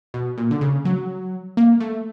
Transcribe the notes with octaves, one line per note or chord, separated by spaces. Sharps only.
B2
A#2
D3
C#3
F#3
A#3
A3